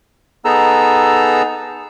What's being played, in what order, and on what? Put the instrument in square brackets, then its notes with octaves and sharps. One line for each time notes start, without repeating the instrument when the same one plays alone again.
[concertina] B3 D#4 G#4 A4 A#5 E6